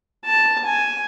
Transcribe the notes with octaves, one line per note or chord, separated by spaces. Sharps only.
A5
G#5